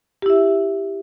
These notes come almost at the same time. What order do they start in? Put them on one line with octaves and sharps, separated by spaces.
G4 E4 E5